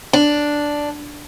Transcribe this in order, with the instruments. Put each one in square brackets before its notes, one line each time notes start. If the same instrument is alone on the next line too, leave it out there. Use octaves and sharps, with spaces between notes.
[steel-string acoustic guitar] D4